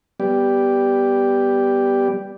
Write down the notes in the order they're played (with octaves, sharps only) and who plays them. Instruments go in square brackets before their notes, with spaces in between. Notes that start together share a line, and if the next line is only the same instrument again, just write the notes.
[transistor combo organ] G3 B3 G4 D5